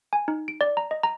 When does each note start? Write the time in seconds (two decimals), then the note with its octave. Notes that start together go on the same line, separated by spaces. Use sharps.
0.13 G#5
0.28 D#4
0.48 D7
0.61 D5
0.77 A#5
0.91 D#5
1.03 A#5